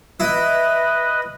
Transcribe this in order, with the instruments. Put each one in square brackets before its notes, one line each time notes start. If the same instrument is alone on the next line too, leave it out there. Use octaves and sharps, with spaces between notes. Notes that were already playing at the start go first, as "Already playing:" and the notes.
[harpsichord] E4 [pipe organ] B4 D#5